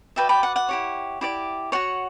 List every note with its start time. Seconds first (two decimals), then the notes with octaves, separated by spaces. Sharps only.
0.16 F#4 B4 D5 E5 G5
0.29 G5 B5
0.43 F#5
0.56 F#5
0.69 E4 G4 C#5
1.21 E4 G4 D5
1.72 F#4 C#5 F#5